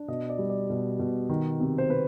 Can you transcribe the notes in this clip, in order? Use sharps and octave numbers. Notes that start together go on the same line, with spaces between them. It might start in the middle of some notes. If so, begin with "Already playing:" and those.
Already playing: D4
B2 D#5
D5
G3
D5
B2
B2
D#3
C3
C5
C3 B4